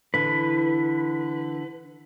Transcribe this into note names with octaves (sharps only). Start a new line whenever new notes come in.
D3 E3 B4